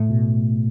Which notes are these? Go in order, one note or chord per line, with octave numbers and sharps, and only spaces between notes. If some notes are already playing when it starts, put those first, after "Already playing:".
Already playing: A2 A3
B2